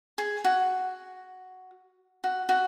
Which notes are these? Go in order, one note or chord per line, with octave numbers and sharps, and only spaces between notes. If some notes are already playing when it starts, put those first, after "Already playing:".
G#4
F#4
F#4
F#4